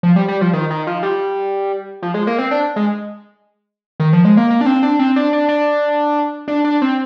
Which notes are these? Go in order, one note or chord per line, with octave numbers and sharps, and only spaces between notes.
F3
G3
G3
F3
D#3
D#3
F3
G3
F3
G#3
A#3
C4
D4
G#3
D#3
F3
G#3
A#3
A#3
D4
C4
D4
C4
D4
D4
D4
D4
D4
C4